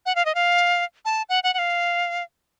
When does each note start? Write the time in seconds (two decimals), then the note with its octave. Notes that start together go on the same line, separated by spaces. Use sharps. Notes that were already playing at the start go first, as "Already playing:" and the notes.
0.06 F#5
0.15 F5
0.25 D#5
0.35 F5
1.05 A5
1.29 F#5
1.44 F#5
1.54 F#5
1.59 F5